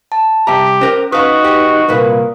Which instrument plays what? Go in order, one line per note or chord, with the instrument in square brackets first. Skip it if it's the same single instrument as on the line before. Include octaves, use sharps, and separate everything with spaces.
[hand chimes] A5
[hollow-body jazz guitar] C2 E5 A#5 [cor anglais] G4
[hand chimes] C#4 [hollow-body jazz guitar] A#4 C5
[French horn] D#4 [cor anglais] F#4 [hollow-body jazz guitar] B4 F5 [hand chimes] D#6
[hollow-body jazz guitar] G4 B4
[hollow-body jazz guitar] C2 A#2 B4 [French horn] A#3